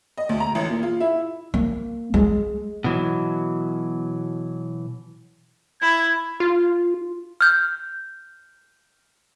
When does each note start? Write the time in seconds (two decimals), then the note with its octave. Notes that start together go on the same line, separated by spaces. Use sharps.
0.18 D#5
0.29 D2
0.40 A#5
0.55 A1
0.70 A#2
0.83 F4
1.00 E4
1.54 A#3
2.14 G#3
2.84 B2 E3 F#3
5.82 E4 G#6
6.40 F4
7.41 F6 G6